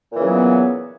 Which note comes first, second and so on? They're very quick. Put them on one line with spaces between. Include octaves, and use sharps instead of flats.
A#2 E3 C#3 F#3 B3